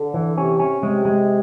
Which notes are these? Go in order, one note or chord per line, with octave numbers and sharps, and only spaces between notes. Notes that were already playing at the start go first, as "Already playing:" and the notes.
Already playing: D3
E3
C3 C#4
C#4
C3 G#3
G#3